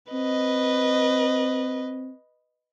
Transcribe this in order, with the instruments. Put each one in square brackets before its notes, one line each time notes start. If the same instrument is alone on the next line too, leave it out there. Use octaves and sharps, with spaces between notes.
[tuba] C4 [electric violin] B4 D#5